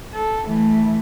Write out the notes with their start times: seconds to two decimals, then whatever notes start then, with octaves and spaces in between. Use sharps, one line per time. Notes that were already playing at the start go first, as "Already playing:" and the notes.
0.14 A4
0.46 E3 A3